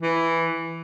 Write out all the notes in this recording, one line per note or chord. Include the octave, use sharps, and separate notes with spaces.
E3